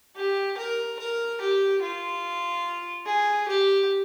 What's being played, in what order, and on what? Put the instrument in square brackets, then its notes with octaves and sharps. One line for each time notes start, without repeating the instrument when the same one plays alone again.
[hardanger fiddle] G4
A#4
A#4
G4
F4
G#4
G4